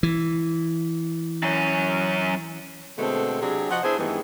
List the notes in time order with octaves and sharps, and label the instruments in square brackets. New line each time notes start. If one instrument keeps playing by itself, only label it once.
[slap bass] E3
[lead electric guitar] F#2 C#4
[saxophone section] B2 D3 G#3 A3 B3 C4
C3 F#3 C4 D4 G4 G#4
F3 F#4 D#5 F#5
B3 D4 E4 G#4 C5
G2 D#3 E3 G#3 A3 B3